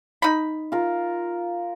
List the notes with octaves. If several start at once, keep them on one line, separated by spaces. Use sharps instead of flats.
D#4 B5
F4 A#4